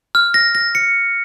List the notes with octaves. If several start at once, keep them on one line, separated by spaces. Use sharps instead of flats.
F6
A#6
A#6
C#7